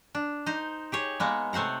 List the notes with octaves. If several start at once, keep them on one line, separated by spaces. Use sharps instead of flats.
D4
D#4 C5
G4 G#4 C#5
G#3 A#3 B3
C3 A3 C5 F#5 A#5